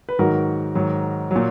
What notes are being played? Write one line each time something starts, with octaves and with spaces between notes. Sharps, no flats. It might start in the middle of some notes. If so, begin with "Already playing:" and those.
B4
G#2 D#3 F#3 F#4 A#4
G#2 D#3 F#3
A#2 F#3